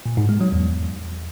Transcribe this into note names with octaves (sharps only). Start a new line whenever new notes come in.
A#2
G#2
G#3
F#3
E2